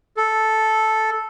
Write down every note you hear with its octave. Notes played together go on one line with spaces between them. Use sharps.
A4